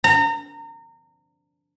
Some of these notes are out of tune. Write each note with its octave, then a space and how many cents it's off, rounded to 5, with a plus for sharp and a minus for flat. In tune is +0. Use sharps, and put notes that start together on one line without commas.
A#5 -30